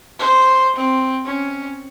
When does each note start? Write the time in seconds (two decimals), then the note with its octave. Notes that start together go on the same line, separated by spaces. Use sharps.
0.19 C5
0.76 C4
1.25 C#4